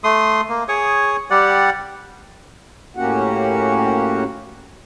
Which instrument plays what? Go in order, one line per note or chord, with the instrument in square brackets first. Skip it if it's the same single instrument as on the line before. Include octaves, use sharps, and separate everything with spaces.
[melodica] A3 C6 D#6
A#3
G#4 C#5 C#6 D#6
G3 G4 D5 F#5
[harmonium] A2 A#3 C#4 F#4 G4 F#5